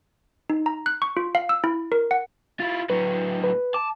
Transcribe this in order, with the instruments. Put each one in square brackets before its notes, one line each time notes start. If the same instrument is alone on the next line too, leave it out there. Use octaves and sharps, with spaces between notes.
[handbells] D#4
A#5
F#6
C#6
F4
F5
E6
E4
A#4
F#5
[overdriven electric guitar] E4 F4 [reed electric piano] A6
[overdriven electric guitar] A2 F#3 [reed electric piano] B4
[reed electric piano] B4
[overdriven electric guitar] A5 [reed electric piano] D6